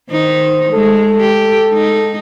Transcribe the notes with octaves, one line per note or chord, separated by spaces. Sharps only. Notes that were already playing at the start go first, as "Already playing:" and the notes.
D#3 D#4 C5
G#3 A4
G4
G#3 D#4